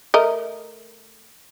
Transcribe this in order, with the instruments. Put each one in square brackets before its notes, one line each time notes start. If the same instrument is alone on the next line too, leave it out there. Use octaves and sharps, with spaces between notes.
[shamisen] A3 A#4 D#5